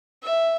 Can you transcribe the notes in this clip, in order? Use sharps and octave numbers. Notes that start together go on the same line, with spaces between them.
E5